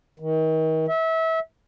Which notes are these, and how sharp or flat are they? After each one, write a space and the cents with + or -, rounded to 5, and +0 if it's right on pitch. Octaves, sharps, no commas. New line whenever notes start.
D#3 +35
E5 -25